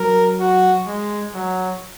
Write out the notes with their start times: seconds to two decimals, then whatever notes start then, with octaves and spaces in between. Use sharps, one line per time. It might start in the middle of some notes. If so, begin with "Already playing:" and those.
Already playing: F#3 A#4
0.40 F#4
0.87 G#3
1.35 F#3